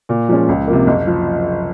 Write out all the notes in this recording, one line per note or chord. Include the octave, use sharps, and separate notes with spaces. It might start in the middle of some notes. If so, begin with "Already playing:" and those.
A#2
F3 G#3 C#4
C#2
C3 F3 A#3
F#1
F3